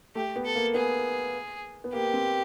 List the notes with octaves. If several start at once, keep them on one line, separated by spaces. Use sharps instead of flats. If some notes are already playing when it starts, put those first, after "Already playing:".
A3 G4
B3
A4
A#3
B3 G#4
B3
A#3 G4
C4